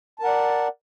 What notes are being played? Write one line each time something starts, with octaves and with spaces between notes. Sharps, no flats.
A#4 D5 F#5 A5